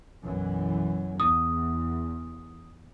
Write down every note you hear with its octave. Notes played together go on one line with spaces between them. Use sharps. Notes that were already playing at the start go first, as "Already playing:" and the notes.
B1 F#2 E3
E2 D#6